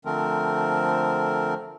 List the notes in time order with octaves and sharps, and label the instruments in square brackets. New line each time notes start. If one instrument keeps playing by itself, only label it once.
[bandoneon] D3 F3 A3 C4 A#4